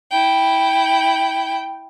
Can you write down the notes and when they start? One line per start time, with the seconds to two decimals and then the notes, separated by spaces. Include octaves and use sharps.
0.11 E4 G5